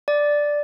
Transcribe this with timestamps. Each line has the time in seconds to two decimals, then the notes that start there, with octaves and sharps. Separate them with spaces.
0.08 D5